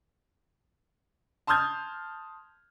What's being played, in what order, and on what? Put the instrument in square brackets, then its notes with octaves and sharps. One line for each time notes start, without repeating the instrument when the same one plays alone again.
[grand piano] A5 C6 D#6 F6 G6 G#6